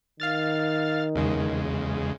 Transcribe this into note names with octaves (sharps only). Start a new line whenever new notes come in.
D#3 F5 F6 A6
E2 C#3 G#3